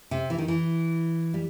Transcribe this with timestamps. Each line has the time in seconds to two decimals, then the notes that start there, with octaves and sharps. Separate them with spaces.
0.11 C3
0.30 E3
0.38 D#3
0.48 E3
1.34 G3